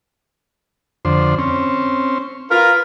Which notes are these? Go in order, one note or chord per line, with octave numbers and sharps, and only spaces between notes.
F2 D3 C5
C4 C#4
F4 A#4 B4